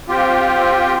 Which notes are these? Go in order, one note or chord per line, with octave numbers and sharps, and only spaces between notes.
C4 F4 G4